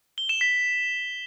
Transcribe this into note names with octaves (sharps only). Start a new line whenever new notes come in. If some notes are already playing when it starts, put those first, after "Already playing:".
G7
E7
B6